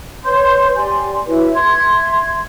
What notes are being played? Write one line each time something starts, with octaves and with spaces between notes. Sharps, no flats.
B4 C#5 C6 G6
G4 D5 G#5 C6
E4 F#4 B4 C#5
E5 C6 G#6